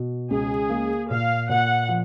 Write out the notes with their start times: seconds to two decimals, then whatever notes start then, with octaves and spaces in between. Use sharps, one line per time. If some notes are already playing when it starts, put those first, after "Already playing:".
Already playing: B2
0.30 C#2 G#4
0.69 A#3
1.10 A#2 F5
1.49 A#2 F#5
1.89 F3